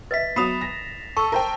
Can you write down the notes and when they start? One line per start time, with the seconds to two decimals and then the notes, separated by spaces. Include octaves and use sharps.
0.11 B4 D#5 E5 A6 B6
0.36 F#3 B3 B5 D#6 C7 E7 F7
0.61 A#6
1.17 A4 A5 C#6 E6
1.32 A#4 C5 G5